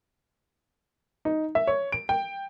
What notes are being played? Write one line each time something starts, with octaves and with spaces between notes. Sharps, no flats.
D#4
E5
C#5
D7
G5